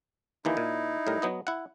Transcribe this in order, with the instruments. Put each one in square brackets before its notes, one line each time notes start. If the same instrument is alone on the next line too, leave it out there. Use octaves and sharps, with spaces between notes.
[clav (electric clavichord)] D#2 E3 A#3 [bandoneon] D#4 E4
[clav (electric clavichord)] A#2
A2 G3 A#4
F#3 B3 D#5
E4 F#5